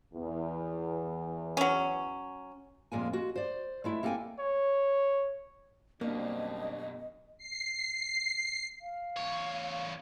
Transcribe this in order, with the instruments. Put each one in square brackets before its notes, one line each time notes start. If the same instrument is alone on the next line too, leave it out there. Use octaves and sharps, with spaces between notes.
[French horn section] E2
[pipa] F#3 C#4
[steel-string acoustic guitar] F2 A#2 G#3 A#3 C4 G#5
G#3 F#4
C5 D5
G#3 A3 E4
A#3 A4 E5 F5 G5 G#5
[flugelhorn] C#5
[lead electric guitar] F#2 B2 [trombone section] G3 C4 D4 [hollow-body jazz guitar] A#3 [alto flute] D#5
[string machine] C7
[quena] F5
[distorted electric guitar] E2 C#5